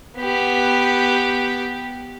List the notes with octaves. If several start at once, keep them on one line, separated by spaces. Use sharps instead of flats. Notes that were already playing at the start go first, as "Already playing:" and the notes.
B3 G4